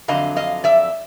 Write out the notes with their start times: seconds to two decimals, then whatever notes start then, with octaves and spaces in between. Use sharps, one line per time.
0.08 F2 D3 F#3 D#5 F5
0.36 D#5 F5
0.64 D5 E5